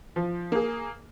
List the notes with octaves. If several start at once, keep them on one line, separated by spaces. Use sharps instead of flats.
F3
A#3 G#4